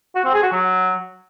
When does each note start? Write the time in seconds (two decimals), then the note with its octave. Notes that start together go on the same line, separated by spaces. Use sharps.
0.15 F#4
0.24 C4
0.34 G#4
0.43 F#4
0.52 F#3